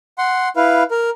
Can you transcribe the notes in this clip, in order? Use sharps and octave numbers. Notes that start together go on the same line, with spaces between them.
F#5 C6
E4 B4 F5
A#4